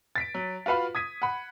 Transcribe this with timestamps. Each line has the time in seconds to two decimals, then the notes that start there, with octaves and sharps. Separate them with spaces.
0.16 A6 B6 D7
0.35 F#3
0.66 F4 F#4 B4 F5 B5
0.95 D#6 G#6 B6 D#7
1.22 F#5 B5